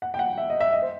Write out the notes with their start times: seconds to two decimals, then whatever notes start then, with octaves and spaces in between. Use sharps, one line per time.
0.02 F#5
0.14 G5
0.19 F#5
0.38 E5
0.50 D#5
0.61 E5
0.73 D#5
0.82 C5